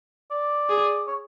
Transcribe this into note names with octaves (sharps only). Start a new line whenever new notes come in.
D5
G#4
C#5